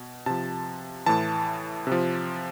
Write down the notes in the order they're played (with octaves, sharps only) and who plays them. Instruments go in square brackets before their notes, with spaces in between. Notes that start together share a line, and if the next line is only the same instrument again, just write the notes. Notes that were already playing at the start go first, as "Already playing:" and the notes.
Already playing: [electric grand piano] B2
C3 F3 A5
A2 E3 A5
C3 F3